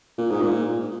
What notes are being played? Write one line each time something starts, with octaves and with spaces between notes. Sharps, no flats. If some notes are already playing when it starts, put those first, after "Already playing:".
A#2
G#2
A#2